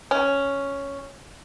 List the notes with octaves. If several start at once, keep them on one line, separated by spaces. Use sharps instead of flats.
C#4